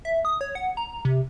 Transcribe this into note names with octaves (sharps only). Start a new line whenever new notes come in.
E5
D#6
C#5
F#5
A#5
C3